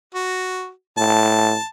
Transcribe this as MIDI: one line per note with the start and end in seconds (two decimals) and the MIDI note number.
0.15 0.70 66
0.98 1.55 45
0.98 1.65 81